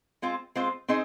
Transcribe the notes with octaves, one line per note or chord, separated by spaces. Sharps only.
G#3 C4 F4 C5
G#3 C4 F4 C5
C4 D#4 G#4 C5 D#5